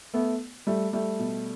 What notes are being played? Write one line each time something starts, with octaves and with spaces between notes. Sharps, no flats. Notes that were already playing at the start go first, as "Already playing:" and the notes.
A3 B3
G3 A3
G3 A3
B2